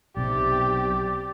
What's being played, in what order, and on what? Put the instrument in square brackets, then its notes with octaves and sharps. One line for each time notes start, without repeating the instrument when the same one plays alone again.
[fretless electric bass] B1 C3 [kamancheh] G4 [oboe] D5